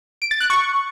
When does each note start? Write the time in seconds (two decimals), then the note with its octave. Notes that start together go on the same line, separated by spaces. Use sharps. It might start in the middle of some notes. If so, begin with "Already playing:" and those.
0.22 D7
0.31 A6
0.40 F#6
0.50 C#6